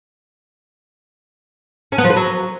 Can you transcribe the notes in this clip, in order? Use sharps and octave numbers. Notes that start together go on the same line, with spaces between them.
C#4
B3
F3
B4
F#3